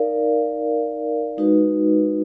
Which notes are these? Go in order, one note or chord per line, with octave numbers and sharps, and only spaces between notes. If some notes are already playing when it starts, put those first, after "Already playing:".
Already playing: D#4 A#4 D5 F5
G#3 D#4 F#4 B4